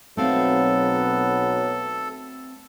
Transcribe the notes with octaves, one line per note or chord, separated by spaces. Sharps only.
B1 F#3 A3 B3 C4 A4 F5